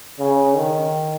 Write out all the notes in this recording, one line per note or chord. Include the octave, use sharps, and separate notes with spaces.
C#3
D#3